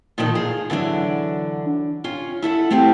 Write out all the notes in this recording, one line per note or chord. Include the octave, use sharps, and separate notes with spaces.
A#2 D3 D#3 F3 D#4
G#4 F5
D3 E3 F#3 D4
C#4 F4
E4 A4 E5 F#5
A3 C4 E4 G4 C5